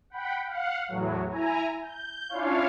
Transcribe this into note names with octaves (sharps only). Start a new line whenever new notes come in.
F#5 G5 B5
F5 F#5
E2 A2 F#3
E4 G#5 A#5
G6
C#4 D4 E4 F4 C#5 F5